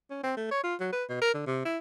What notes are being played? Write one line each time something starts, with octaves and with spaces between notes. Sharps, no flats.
C#4
C4
A3
C#5
F4
F#3
B4
B2
A#4
D3
C3
E4